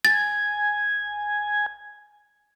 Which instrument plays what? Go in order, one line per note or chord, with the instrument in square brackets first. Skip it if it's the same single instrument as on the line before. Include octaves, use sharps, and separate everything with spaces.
[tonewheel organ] G#5 [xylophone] A6